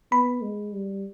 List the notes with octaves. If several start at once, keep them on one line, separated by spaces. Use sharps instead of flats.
B3 B5
G#3
G3